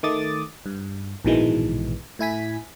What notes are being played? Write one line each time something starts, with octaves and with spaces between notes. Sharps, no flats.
D#3 A3 D6 D#6 A6
G2
A#1 G#2 B2 D#3 E3 G#3
A2 E4 G#5 B6